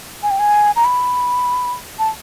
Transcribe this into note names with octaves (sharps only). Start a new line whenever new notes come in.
G#5
G5
G#5
A#5
B5
A5